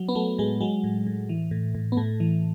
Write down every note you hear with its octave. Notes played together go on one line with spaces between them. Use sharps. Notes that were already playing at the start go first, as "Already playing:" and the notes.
Already playing: F#3
B3
F#3 A3
A2 G#3
F#3 G#3
A2
A2
E3
A2
A2
B3
A2 A3
E3